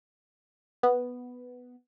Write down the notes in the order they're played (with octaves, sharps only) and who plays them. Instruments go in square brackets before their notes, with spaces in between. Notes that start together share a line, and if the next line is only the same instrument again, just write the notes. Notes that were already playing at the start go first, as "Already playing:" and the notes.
[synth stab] B3